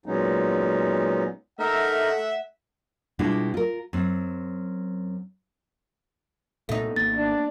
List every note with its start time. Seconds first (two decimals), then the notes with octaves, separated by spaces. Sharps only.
0.06 A#2 F#3 G#3 B3 C#4 D#4
1.60 A3 D#4 A#4 E5 F#5
3.19 B2 G3 G#3 D4 E4 F4
3.54 F4 A#4
3.93 F#2 C4
6.69 C2 A#2 A3 B3 D#4
6.96 G#1 A#3 B3 A6
7.14 D4